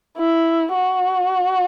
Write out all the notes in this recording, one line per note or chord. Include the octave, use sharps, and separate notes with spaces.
E4
F#4